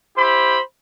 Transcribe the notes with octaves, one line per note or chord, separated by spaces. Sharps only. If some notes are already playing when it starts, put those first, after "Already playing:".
E4 G4 C5 B5